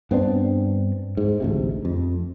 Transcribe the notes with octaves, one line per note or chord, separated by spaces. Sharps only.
G2 B3 C4 D4
G#2
A1 D2 C3
F2